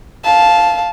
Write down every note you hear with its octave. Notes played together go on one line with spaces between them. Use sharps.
F5 A5